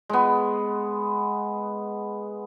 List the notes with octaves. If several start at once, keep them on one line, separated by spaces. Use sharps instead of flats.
G#3 B3